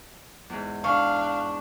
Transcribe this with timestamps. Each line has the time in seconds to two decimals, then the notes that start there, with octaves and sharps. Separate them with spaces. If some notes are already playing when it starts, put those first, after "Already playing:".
0.50 E2 G#2
0.84 D4 F5 C#6